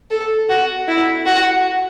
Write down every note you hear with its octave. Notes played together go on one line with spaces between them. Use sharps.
A4
F#4
E4
F#4